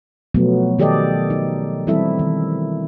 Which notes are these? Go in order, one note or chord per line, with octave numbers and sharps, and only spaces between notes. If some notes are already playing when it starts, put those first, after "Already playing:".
B2 F3 F#3 A3 B3
D#3 G4 A4 D5 D#5
D#4
E3 G3 C4 E4 A4 E5
D#3